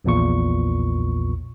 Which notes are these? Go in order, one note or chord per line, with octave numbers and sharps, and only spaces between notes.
A#1 E2 A#2 C#6